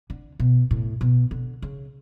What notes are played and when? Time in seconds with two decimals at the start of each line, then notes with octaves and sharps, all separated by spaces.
0.10 D3
0.40 B2
0.71 A2
1.01 B2
1.31 D3
1.62 C#3